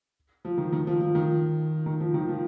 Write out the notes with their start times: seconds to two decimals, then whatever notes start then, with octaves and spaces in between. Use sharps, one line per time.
0.45 F3
0.58 D#3
0.73 D#3
0.87 F3
1.00 F3
1.15 D#3
1.86 D#3
2.00 F3
2.14 D#3
2.29 F3